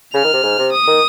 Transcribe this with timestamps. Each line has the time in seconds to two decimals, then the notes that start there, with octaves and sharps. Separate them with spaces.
0.14 C#3 F6
0.24 D#3
0.33 C3
0.43 G#2
0.58 C3
0.72 D#6
0.87 D#3